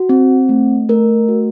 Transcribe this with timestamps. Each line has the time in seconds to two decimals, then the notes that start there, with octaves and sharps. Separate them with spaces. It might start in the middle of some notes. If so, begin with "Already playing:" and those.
Already playing: F#4
0.09 C4
0.49 A3
0.89 A3 A#4
1.28 F#4